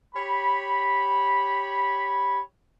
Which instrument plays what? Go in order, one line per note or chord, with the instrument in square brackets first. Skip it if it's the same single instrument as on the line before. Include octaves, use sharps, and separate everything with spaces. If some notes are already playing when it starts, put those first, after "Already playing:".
[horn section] G4 C#5 B5